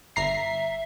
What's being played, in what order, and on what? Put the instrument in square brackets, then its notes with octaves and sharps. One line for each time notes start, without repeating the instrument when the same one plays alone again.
[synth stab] G1 A#5 C7 [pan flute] E5